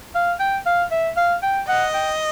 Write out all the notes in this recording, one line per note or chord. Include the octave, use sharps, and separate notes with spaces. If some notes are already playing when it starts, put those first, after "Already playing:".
F5
G5
F5
E5
F5
G5
D#5 F#5
G5